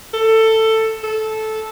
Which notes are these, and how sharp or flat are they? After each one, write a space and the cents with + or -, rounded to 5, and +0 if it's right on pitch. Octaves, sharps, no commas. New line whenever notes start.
A4 +15
A4 -10